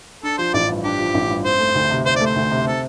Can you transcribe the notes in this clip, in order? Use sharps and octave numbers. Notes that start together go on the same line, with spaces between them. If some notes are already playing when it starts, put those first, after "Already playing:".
D4 A4
F3 C5
A1 D5
G2
D4 G4
F3
A1
G2
C4 C5
A3
D2
C3
C4 C5
A3 D5
C5
D2
C3
C4 A4